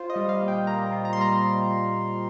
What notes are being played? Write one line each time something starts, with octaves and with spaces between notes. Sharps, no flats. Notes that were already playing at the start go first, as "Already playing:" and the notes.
Already playing: F4 C5
D#5
G3
F5
A#2
G5
A#3 A#5
F4
A#5
C6
G3 A#5